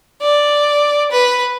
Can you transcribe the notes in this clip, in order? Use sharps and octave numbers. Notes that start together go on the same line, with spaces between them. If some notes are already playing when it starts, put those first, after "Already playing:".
D5
B4